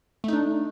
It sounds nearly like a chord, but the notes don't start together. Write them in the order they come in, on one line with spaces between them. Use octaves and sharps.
A3 D#4 D4